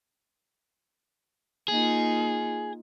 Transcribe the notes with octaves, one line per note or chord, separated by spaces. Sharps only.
A#3 D#4 F4 G#4